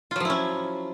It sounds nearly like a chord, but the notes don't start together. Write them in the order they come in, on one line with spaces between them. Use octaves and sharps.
F4 F#3 F3 E4 C#4